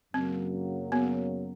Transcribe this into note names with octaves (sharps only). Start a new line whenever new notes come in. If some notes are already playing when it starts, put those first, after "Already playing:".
F#2 C#3 F#3 A#3 C4
B3